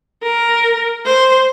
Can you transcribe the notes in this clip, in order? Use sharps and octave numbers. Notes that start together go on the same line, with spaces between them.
A#4
C5